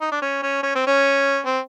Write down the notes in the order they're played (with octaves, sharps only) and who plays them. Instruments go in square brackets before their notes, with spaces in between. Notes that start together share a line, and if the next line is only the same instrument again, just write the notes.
[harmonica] D#4
D4
C#4
C#4
C#4
C4
C#4
C4